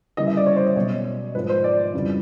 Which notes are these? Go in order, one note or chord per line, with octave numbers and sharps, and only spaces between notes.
C#3 E3 G3 A#3 D#5
E5
D5
C#5
C5
D#5
B2 F#3 B3 C#5
G#2 F3 A#3 B4
C5
D5
F2 C#3 E3 G3